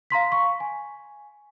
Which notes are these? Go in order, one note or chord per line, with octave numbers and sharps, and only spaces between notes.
F5 A#5 C6 B6
C#6
G#5